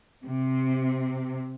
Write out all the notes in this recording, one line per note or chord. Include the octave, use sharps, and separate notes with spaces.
C3